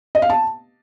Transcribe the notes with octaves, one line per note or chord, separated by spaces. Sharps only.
D#5
F5
A5